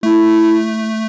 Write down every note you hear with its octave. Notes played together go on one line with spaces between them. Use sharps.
A3 E4